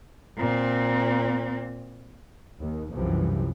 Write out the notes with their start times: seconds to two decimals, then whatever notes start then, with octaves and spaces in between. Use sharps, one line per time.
0.38 A#2 C4
2.60 D#2
2.94 C2 F#2 C3 E3 F3